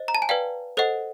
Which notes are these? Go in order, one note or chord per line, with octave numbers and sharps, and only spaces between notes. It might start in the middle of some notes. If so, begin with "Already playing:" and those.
Already playing: C5 D#5
A#5
A5
G#5
B4 D5 F5 G5
A4 C5 D#5 F#5